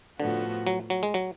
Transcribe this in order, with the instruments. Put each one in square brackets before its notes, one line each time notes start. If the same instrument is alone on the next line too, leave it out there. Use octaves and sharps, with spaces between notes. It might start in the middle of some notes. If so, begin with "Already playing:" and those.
[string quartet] A2 F3 B3 F#4 [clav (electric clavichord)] D3
[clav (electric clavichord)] F#3
F#3
G#3
F#3